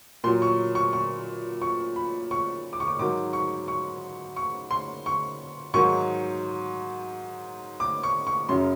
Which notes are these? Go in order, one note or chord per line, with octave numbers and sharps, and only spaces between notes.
A#2 F#3 C6
C#6
C#6
C#6
C#6
B5
C#6
D6
C#6
D6
G#2 D#3 F#3 D6
C#6
C#6
C#6
C6
C#6
G#2 D#3 F#3 C#6
D6
C#6
C#6
F#2 C#3 F#3 C6